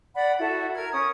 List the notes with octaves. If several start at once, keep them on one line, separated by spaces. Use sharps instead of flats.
D5 F#5 B5
E4 F#4 A4
A#4 F6 G#6
C#4 D#6